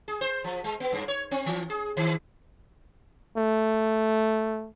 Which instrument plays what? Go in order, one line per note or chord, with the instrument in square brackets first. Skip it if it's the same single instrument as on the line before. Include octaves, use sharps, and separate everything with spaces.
[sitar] G#4
C5
F3
G#3
B3
G2
C#5
C4
E3
G#4
D#3
[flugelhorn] A3